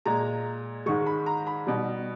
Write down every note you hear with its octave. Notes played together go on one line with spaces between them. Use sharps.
A#2 G#3 A#5
G#2 D#3 G#3 C#6
B5
A#5
B5
B2 G3